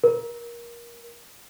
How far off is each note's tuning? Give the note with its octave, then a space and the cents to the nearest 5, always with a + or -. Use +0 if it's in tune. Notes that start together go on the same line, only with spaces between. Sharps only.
A#4 +20